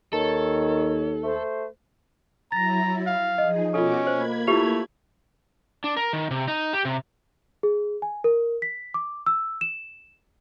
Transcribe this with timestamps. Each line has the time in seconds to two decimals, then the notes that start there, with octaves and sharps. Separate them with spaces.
0.13 D#2 D#3 A4 C#5
1.24 A3 C5
2.52 F#3 E4 A#5 A6 A#6
3.07 F5
3.38 F3 D#4 G#4 D#5
3.74 B2 C#4 F4 F#4 A4 D6
4.07 A#3 C5 B5 G#6
4.47 A3 E4 F4 G4 B4 F7
5.84 D4
5.97 A#4
6.13 D#3
6.31 C3
6.48 D#4
6.73 G4
6.85 C3
7.63 G#4
8.02 G#5
8.24 A#4
8.62 B6
8.94 D6
9.26 E6
9.61 E7